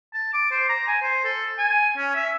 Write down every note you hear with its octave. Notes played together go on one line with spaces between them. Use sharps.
A5
D6
C5
A#5
G#5
C5
A4
G#5
C#4
E5